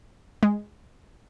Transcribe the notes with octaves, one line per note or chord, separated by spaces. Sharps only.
G#3